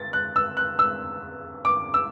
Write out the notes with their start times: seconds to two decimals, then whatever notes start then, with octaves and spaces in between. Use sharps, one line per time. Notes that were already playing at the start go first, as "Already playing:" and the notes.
Already playing: A6
0.13 F#6
0.36 E6
0.57 F#6
0.79 E6
1.65 D6
1.94 E6